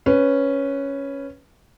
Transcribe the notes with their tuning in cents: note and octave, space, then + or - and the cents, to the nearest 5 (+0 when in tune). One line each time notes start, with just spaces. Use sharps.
C#4 +0 B4 +0